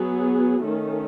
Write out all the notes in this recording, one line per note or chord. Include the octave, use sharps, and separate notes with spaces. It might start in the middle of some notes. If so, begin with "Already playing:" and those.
Already playing: F#3 B3 G#4
D#3 A3 C#4